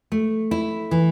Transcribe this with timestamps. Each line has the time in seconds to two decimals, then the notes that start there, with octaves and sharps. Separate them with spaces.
0.12 A3
0.51 E4
0.91 E3